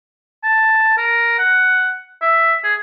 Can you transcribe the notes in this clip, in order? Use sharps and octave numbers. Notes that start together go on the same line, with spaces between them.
A5
A#4
F#5
E5
G#4